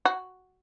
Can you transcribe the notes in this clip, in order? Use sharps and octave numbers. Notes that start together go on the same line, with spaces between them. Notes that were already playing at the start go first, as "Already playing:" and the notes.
F#4